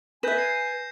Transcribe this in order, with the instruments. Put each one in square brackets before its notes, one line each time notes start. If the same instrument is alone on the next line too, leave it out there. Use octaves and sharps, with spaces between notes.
[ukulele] B4 E5 [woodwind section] G#5 [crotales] G6 A#6 E7
[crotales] C7